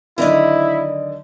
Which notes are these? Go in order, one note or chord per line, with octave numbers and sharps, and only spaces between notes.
D3 D#3 F#3 E4 A#4 D5 D#5